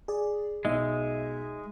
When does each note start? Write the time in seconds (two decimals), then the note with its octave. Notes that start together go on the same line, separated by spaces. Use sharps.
0.08 G#4 D5
0.65 B1 G#3 D#4 E5